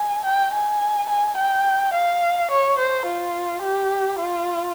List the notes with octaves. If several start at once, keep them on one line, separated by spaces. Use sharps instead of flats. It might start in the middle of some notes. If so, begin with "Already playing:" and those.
Already playing: G#5
G5
G#5
G#5
G5
F5
C#5
C5
F4
G4
F4